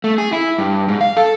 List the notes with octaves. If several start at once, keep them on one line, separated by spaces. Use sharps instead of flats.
A3
G#4
E4
G2
G#2
F5
A4